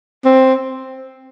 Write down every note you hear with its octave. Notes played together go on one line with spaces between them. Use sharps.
C4